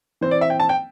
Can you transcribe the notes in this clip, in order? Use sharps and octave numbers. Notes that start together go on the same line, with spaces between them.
E3 C4 C5
D5
E5
G5
A5
G5